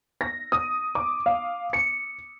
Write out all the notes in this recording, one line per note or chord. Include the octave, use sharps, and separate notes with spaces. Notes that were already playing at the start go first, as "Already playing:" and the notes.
A#6
D#6
D6
F5
C#7